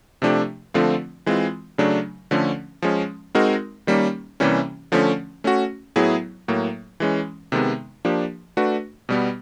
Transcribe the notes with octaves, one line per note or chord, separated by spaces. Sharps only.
C3 F3 A3 D4 G4
D3 F3 A3 C4 F4
E3 G#3 C4 F4
C#3 F#3 A3 D4
D3 F3 A3 C#4
F3 G#3 C#4
G#3 C4 D#4 F#4 A#4
D#3 G3 A#3 C#4
C3 E3 G3 A#3 C#4
D3 F3 A3 C#4
A3 C#4 F#4
A2 F#3 B3 E4 G#4
A2 F#3 A#3
E3 G#3 C#4
C3 D#3 G#3 B3
F3 A#3 D4 G4
A3 D4 F#4 B4
B2 G3 B3